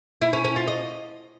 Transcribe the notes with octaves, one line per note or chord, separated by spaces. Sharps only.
E4
C#4
C#4
F4
D#5